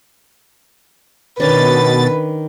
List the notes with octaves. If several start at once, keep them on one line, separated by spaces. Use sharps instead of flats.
B2 D#3 C#4 D4 B4 A6